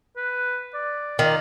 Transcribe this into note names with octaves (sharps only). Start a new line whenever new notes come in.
B4
D5
D#3 F4